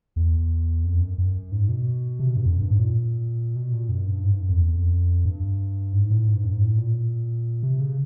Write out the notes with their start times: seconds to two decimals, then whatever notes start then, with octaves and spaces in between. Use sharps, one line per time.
0.16 E2
0.84 F2
1.01 F#2
1.18 F#2
1.52 G#2
1.69 B2
2.19 C3
2.28 B2
2.36 G2
2.45 F2
2.54 F#2
2.62 G2
2.71 G#2
2.79 A#2
3.56 B2
3.73 A#2
3.89 F#2
4.06 G2
4.24 G#2
4.32 G2
4.40 F#2
4.49 F2
4.58 E2
4.74 F2
5.25 G2
5.93 G#2
6.10 A2
6.28 G#2
6.36 G2
6.44 F#2
6.52 G#2
6.61 A2
6.78 A#2
7.63 C3
7.79 C#3